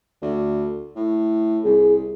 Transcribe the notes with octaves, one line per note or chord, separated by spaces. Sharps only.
D2
A2
C2 G#4